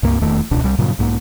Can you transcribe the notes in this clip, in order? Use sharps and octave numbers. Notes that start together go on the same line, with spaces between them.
C#2 G2 A#3
D#1 E2 D#3 A3
E1 C#2 B2 D4
C2 G3
G2 A#2 C#3 F#3
B1 G#2 A#3